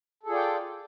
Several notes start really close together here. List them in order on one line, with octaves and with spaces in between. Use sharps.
A4 G#4 F4 D5 G5